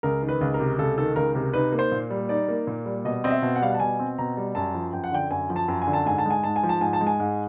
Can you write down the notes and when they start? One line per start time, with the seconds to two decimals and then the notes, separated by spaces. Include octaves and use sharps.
0.03 C#2 A#4
0.23 D#3
0.29 B4
0.41 C#2
0.54 A#4
0.60 C3
0.78 C#2 A4
0.98 D#3 A4
1.16 C#2 A#4
1.35 C3 A#4
1.53 D#4 B4
1.72 A#3
1.79 C5
1.92 A#2
2.10 G3
2.29 D#4 D5
2.48 A#3
2.67 A#2
2.85 G3
3.05 B2 D#5
3.24 C4 D#5
3.31 E5
3.42 B2
3.56 F#5
3.61 G3 F5
3.69 F#5
3.75 A5
3.80 B2 G#5
3.99 C4
4.18 B2 A#5
4.37 G3
4.55 F#2 A5
4.75 F3
4.93 F#2 G5
5.04 F#5
5.12 D3 G5
5.30 F#2 G#5
5.50 F3
5.56 A5
5.68 F#2
5.82 G#5
5.87 D3
5.93 A5
6.06 G#2 G#5
6.18 A5
6.26 G#3 G#5
6.44 G#2 A5
6.56 G#5
6.63 F3
6.69 A5
6.81 G#2 G#5
6.93 A5
7.01 G#3
7.07 G#5
7.20 G#2